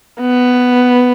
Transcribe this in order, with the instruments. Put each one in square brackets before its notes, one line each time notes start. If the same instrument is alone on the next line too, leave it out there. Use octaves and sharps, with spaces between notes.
[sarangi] B3